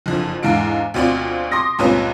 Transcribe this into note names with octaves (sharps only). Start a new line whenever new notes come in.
F#1 F2 D3
E2 G#2 D3 F5 D7
D2 B2 C4 F4 D5
C6 D6 D#6 A#6
C#2 G2 A#2 C4 C#4 B4